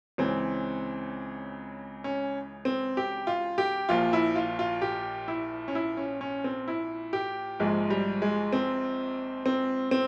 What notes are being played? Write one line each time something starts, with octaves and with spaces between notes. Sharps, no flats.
C#2 C#3 E3 C4
C#4
C4
G4
F4
G4
A#1 A#2 F3 F4
E4
F4
F4
G4
E4
C#4
E4
C#4
C#4
C4
E4
G4
A#1 G#2 F3 G#3
G3
G#3
C4
C4
C4